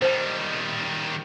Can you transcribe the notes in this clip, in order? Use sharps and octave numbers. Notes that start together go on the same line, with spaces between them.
D#3 G3 C5 A5